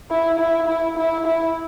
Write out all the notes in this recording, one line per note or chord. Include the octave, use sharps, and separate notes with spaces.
E4
E4
E4
E4
E4